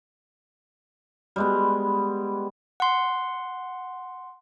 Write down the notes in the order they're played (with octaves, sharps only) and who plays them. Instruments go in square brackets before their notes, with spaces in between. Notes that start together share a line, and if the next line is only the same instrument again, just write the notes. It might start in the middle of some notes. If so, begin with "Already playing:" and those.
[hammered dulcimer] G3 G#3 B3
[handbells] F#5 C6